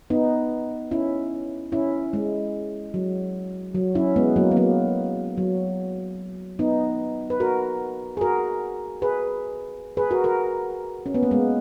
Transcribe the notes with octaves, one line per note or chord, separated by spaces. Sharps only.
B3 D#4
C#4 E4
C#4 E4
G#3
F#3
F#3
C#4 E4
G#3 B3
F#3 A#3
B3
F#3 A#3
F#3
B3 D#4
B4
F#4 A#4
G#4
F#4 A#4
G#4 B4
G#4 B4
F#4 A#4
F#4 A#4
C#4
B3
A#3
G#3 B3